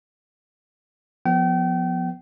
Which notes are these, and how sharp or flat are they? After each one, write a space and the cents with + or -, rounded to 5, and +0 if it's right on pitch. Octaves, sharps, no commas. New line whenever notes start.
F3 +20 B3 +0 G5 -35